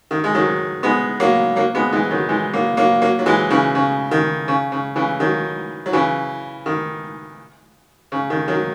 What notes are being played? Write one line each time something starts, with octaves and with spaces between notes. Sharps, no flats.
D#3
G#3
D#3 F#3
G#3 B3
F#3 A#3
F#3 A#3
G#3 B3
E3 G#3
D#3 F#3
E3 G#3
F#3 A#3
F#3 A#3
F#3 A#3
F#3
E3 G#3
C#3 E3
C#3
D#3
C#3
C#3
C#3 E3
D#3 F#3
F#3
C#3 E3
D#3
C#3
D#3
D#3 F#3